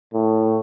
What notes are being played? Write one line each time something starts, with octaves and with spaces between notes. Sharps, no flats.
A2